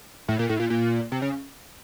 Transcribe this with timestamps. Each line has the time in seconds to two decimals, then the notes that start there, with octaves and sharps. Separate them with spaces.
0.28 A2
0.39 A#2
0.49 A2
0.60 A#2
0.70 A#2
1.12 C3
1.22 C#3